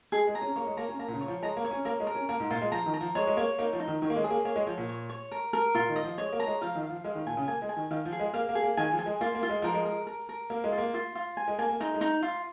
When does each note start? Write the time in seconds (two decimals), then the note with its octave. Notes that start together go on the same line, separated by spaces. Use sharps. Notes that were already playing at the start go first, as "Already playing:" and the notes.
0.12 G#3 G#4
0.27 G#3
0.35 A#5
0.42 C#4
0.56 A#3 C#5
0.67 G#3
0.77 A#3 A#5
0.88 C#4
0.99 A#3 A#5
1.08 A#2
1.14 C#3
1.21 C#5
1.28 F3
1.42 G#3 A#5
1.57 A#3
1.65 C#5
1.71 C#4
1.85 A#3 A#4
2.00 G#3
2.07 A#4
2.15 C#4
2.29 A#3 A#4
2.40 G#2
2.50 A#2 F4
2.61 G#3
2.72 F3 A#5
2.86 D#3
2.94 A#5
3.01 F3
3.15 G#3 C#5
3.27 G#3
3.37 A#3 C#5
3.58 A#3 D#4
3.73 F3
3.80 D#4
3.88 D#3
4.02 D#3 C#5
4.10 A#3
4.16 G#3
4.24 G#4
4.31 A#3
4.45 A#3 C#5
4.56 G#3
4.67 F3 C#5
4.78 A#2
4.89 C#5
5.09 C#5
5.31 A#4
5.53 A#4
5.75 A#2 F4
5.89 D#3
5.96 D#5
6.03 F3
6.18 G#3 C#5
6.32 A#3
6.40 A#5
6.47 G#3
6.61 F3 F5
6.75 D#3
6.83 F5
6.90 F3
7.05 G#3 F5
7.15 D#3
7.26 A#2 G#5
7.37 C#3
7.48 A#3 G#5
7.62 G#3
7.69 G#5
7.77 D#3
7.91 D#3 F5
8.05 F3
8.12 G#4
8.20 G#3
8.34 A#3 F5
8.49 A#3
8.55 G#4
8.63 A#3
8.77 D#3 G#5
8.92 F3
8.99 G#5
9.06 G#3
9.21 A#3 F4
9.35 A#3
9.43 F4
9.50 G#3
9.62 F3 A#4
9.74 G#3
9.85 A#4
10.07 A#4
10.29 A#4
10.50 A#3 F5
10.64 G#3
10.72 F4
10.78 A#3
10.94 F4
11.15 F4
11.37 G#5
11.48 G#3
11.58 A#3 G#5
11.69 A#3
11.80 G#3 D#4
11.94 G#3
12.01 D#4
12.23 F4